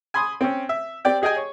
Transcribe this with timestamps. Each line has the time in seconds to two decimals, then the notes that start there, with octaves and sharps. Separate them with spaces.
0.14 G#5 B5 C6 D#6
0.41 C4 C#4
0.69 E5
1.05 C4 G4 D5 G5
1.22 G4 G#4 D#5 G5 G#5
1.36 C#5